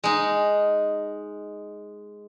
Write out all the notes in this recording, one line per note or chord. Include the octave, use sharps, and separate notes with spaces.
G#3 D#4